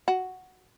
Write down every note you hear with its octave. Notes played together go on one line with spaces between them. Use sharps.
F#4